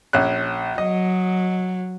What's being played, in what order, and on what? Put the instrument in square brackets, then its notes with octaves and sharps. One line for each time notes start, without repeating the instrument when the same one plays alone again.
[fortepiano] A#1 C#4 F#6
[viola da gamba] F#3 [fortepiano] D#5